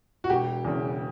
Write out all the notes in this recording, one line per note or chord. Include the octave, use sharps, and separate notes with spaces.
F#4
E1 G4
E2 C#3